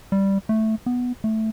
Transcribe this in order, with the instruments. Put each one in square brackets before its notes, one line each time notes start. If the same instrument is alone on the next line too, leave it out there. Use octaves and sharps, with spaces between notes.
[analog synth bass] G3
A3
B3
A3